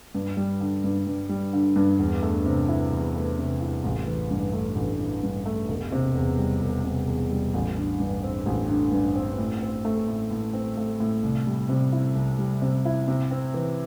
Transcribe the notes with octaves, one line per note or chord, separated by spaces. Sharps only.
G2
G3
D3
G2
G2
G3
D3
G2
E2
A3
C3
E4
E2
A3
C3
E4
A1
E3
G2
A3
A1
E3
G2
A3
E1
C3
E2
G3
E1
C3
E2
G3
A1
D3
G2
C4
A1
D3
G2
C4
A2
C4
A3
A2
A2
C4
A3
A2
C2
G3
C3
E4
C2
G3
C3
E4
C3
C4
E3